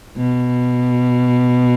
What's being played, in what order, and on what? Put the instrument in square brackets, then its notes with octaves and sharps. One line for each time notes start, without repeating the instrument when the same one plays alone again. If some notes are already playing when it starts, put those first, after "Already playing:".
[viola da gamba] B2